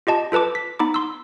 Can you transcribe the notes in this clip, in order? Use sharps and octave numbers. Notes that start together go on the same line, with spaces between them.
F4 G4 D#5 A5
F4 A4 B4 A5 D6
B6
B3 D#4 B5 D6
C6 E6